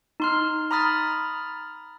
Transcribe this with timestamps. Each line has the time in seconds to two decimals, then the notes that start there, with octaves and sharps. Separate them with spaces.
0.20 D#4 C6 F6
0.71 A#5 B5 D#6 F6 A6